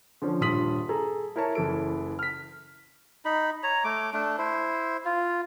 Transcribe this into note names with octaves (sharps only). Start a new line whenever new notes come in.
D3 F3 C#4
D#1 G2 F4 D#6 B6 F#7
G#4 A4 A#5
E4 A#4 C#5 A5
F#1 E3 A4 D7
F6 B6
D#4 B5
C#5 A#5
A3 D6
A3 D4
E4 C5
F4